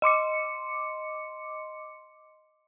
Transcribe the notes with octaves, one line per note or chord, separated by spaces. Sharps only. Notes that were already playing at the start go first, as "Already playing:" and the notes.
D#5 C6 D6 C#7